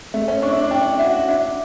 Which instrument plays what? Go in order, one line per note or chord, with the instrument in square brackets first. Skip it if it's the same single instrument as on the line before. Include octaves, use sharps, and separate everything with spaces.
[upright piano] A3 [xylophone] E5
[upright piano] C#4
[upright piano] D4 [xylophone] C#6
[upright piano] E4
D4
[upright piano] D4 [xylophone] G5
[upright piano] E4
[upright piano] F#4 [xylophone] E5
[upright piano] F#4
[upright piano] D4 [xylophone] E5